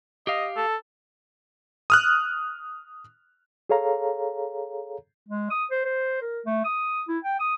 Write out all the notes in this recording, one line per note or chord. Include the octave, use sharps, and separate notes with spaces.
G4 D#5 F5
A4
D#6 F6 F#6
G#4 A4 C#5 F5 A#5
G#3
D#6
C5
C5
A#4
A3
D#6
E4
G5
D#6